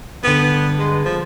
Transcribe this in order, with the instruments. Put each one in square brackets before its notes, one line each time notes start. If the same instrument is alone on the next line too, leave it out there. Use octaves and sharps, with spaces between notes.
[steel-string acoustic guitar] G2 D3 [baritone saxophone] B3
[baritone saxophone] G#3
F3